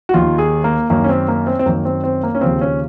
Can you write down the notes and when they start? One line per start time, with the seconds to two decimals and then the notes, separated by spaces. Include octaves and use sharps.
0.09 F#4
0.14 D#2 D#3 F4
0.38 G#4
0.64 A#3
0.90 F#2 D#3 A#3
1.04 C#4
1.09 C4
1.28 A#3
1.47 C4
1.59 C4
1.66 F#2 D#3 A#3
1.85 C4
2.04 C4
2.23 A#3
2.35 C#4
2.41 D#2 C#3 F3 C4
2.61 C#4